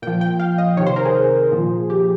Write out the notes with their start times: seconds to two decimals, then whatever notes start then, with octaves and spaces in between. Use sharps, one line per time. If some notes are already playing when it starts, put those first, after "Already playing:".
0.02 A#2 F3 G5
0.21 G5
0.40 F5
0.58 D#5
0.77 C3 D#3 C#5
0.86 C5
0.96 A#4
1.05 G#4
1.52 A#2 F3
1.90 G4